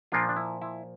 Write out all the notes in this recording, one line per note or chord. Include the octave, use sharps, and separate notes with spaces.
A#2 F3 A#3 D4 F4
D4
E4
E4